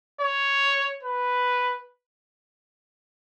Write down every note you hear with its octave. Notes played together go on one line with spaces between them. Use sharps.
C#5
B4